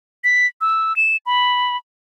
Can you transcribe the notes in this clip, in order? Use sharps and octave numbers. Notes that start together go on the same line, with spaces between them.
B6
E6
E7
B5